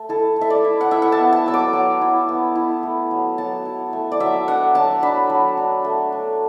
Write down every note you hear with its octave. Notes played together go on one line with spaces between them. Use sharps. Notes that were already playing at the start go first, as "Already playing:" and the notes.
Already playing: A3
E4 A4
A3
E5
D5
E4
F#5
E4 E5
F#5
A5
B3
A5
F#3 E6
D6
F#3
E4
B3
E4
A3
F#3
F#3 A5
E4
A3
D5
F#3 E5
D4 F#5
F#3 A5
D4 B5
F#3
D4
A3
D4